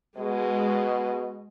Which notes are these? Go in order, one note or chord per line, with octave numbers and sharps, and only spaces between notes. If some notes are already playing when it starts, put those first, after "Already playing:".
B2 G#3